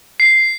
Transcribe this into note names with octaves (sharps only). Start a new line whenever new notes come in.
C7